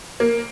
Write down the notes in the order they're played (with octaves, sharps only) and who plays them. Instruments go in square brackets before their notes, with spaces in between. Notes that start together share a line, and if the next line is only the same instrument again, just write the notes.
[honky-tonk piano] A#3